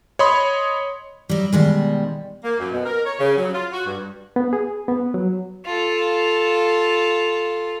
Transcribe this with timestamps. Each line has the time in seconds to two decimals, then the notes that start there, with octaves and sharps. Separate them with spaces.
0.19 C#5 D#5 B5 C6 D#6
1.29 F#3 G3
1.53 B2 D#3 G3 G#3
2.44 A#3
2.59 F#2
2.72 B2
2.86 A#4
3.06 C#5
3.20 C#3
3.37 F#3
3.53 F4
3.72 F#4
3.86 G2
4.36 B3
4.53 G#4
4.88 B3
5.14 F#3
5.65 F4 A4